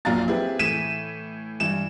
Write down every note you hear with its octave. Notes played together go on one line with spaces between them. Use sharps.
A#1 F#2 A#2 F5 A#5 A6
C4 E4 G4 G#4 B4
A2 E3 B6 D#7 E7
G2 E3 E7